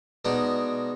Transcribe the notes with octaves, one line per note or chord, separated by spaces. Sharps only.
B2 G#3 D4 D#4